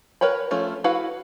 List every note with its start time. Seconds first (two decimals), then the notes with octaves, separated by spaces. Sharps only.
0.21 A#4 B4 C#5 G5 B5
0.51 F3 A3 C#4 F4
0.84 E4 F#4 B4 F5 F#5